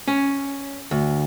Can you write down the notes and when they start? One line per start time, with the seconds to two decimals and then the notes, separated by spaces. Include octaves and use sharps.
0.08 C#4
0.91 D2